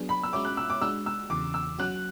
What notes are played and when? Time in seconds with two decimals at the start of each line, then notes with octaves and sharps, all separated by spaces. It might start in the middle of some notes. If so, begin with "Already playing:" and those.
Already playing: F#3 B3 D4 G#4
0.09 B5
0.23 E6
0.33 G#3 C#4 F#4 C#5 E5 D6
0.45 F#6
0.57 E6
0.70 D6
0.81 G#3 D4 F#4 E6
1.06 E6
1.30 E2 C#3 E3 D6
1.54 E6
1.79 F#3 C#4 F#4 F#6